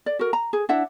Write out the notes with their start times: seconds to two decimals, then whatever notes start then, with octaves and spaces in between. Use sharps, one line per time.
0.06 D5
0.19 F#4 A#4
0.33 A#5
0.53 G#4
0.69 D4 E4 E5 F#5